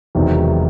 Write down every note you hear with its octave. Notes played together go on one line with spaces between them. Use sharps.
E1 E2 C3 D#3 F#3